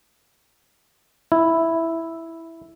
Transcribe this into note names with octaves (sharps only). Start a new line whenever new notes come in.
E4